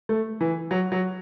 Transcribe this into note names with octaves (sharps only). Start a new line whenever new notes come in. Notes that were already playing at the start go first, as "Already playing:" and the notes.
A3
E3
F#3
F#3